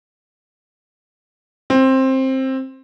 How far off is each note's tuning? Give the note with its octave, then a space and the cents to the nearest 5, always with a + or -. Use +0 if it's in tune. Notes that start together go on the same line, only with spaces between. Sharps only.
C4 +15